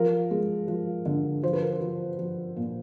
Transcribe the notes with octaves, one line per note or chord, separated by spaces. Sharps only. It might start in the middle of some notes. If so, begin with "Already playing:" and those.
Already playing: F3 A#4
G#3
F3
D3
F3 C5
B4
A#4
B4
F3
F3
A#2